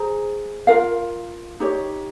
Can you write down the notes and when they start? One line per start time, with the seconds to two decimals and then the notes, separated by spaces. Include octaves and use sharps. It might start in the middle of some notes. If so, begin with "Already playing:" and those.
Already playing: G#4 C5 A#5
0.67 F4 A#4 F5
1.60 D#4 G4 C#5